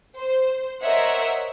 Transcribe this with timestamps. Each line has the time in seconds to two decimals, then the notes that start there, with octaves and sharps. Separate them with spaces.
0.16 C5
0.83 A#4 C5 C#5 D#5 E5 F#5